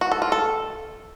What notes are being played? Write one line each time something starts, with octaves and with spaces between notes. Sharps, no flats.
F#4
A4
F4
A4